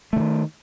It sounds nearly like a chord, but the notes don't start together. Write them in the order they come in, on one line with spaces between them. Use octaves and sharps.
A3 D3 D#3